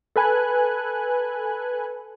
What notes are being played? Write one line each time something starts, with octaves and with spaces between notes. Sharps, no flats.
A4 B4 G#5 F#6